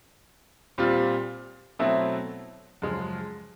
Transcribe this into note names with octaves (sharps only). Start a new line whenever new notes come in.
A#2 G3 C4 F4
B2 F#3 A3 C4 E4
F#2 C#3 F3 G#3